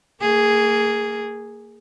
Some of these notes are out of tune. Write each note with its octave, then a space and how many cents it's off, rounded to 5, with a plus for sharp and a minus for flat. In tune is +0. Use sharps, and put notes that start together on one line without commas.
A#3 -30 G#4 +0